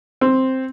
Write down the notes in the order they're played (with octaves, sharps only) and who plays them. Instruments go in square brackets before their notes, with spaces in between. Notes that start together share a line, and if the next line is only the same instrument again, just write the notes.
[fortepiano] C4